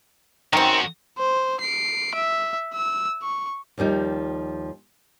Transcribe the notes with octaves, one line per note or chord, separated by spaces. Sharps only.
F#2 D#3 C4 F#4
C5
C7 D7
E5
E6
C#6
D#2 F3 G3 D#4